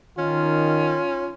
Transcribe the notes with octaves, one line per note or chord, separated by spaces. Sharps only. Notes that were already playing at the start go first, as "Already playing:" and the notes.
D#3 C#4 F4